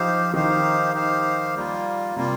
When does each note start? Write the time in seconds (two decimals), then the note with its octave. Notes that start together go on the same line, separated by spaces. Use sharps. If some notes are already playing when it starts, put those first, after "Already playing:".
Already playing: F3 D#4 G4 C5 F5
0.33 D#3 D#4 G4 C5 F5
0.94 D#4 G4 C5 F5
1.55 G3 A#3 F4
2.16 C3 G3 A#3 F4